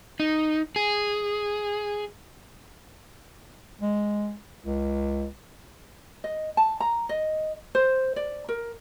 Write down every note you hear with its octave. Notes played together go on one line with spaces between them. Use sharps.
D#4
G#4
G#3
C#2
D#5
A5
A#5
D#5
C5
D5
A#4